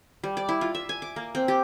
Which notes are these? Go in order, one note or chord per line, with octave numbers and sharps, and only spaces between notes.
G3
D5
E4
F4
E5
G#5
D6
A#3
C4
G4